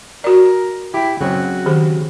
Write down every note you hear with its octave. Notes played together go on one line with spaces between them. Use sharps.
F#4 A#4 D5
E4 G4 G5
C#3 F#3 C4 F#4
D#3 G4 G#4